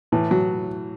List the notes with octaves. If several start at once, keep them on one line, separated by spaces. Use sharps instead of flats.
A2 E3
F#3